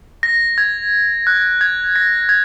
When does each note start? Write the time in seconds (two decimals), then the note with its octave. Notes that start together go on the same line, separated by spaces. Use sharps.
0.23 A#6
0.58 G#6
1.27 F#6
1.61 G#6
1.96 A#6
2.29 G#6